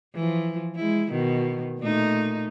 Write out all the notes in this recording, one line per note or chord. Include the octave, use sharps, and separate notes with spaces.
E3 F3
G#3 E4
B2 D#3
A#2 A3 D#4